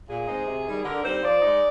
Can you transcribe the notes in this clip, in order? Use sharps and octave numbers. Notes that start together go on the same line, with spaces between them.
A#2 G#4
G#3 C4 D#4
C3
D#3 G3
D3 A#4
G3 C4 D#4 C5
F3 D5
G#3 D#4